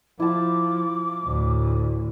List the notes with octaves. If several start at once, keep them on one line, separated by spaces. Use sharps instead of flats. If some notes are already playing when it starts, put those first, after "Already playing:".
F3 E4 A5 D6
D2 A2